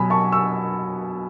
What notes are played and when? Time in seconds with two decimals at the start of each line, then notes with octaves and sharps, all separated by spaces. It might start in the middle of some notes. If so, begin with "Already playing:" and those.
Already playing: B2 F#3 G#5 B5
0.10 A5 C#6
0.32 C#6 E6